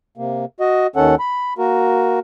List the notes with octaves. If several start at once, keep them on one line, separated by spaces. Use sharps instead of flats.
C3 A#3
F#4 D#5
D#2 D#3 C#4 A4 F#5
B5
A#3 F#4 A#4